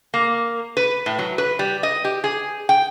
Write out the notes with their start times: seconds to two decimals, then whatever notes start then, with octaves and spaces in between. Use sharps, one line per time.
0.14 A#3
0.77 B4
1.06 A2
1.19 F#3
1.38 B4
1.59 G3
1.83 D#5
2.05 G4
2.24 G#4
2.69 G5